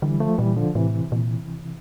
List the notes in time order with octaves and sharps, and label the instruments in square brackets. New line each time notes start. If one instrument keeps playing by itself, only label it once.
[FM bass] D3 [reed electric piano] E3 G3
[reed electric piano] F3 A3
[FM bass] A#2 [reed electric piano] E3 G3
[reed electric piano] D3 F3
[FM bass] A2 [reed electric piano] C3 E3
[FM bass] A#2